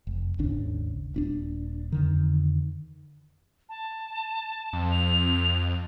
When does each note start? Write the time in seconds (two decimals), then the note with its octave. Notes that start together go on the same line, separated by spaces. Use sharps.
0.07 F1
0.39 G#1 D#2 C#3 D4
1.14 D#1 C#4 D4
1.92 F2 D3 D#3
3.69 A5
4.73 F2
4.91 F7